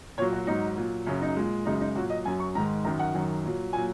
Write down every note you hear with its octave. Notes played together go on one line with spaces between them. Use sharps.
A#2 F#3 C#5
F#4
G#2 F#3 D#4
A#2 F#3
F#2 C#3 F#3 C#4
D#4
A#2 G#3
F#2 C#3 G#3 D#4
D#4
A#2 F#3 F#4
D#5
F#2 F#3 G#5
C#6
G#2 D#3 G#3 A#5
F#2 D#3 F#3 A#5
F#5
F#2 D#3 F#3
A#2 F#3
A#2 F#3 G#5